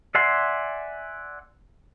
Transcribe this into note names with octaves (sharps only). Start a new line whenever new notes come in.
D5 E5 F#5 G#5 C6